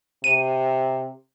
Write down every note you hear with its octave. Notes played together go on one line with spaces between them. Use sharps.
C3 D#7